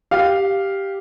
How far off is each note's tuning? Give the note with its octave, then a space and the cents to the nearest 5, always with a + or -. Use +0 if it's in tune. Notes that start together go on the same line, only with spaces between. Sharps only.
G4 +0 F5 +0